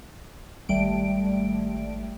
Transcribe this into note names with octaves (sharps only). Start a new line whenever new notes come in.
G#1 G3 A3 D7